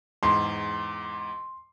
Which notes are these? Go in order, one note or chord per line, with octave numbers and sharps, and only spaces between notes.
E2 G#2 C6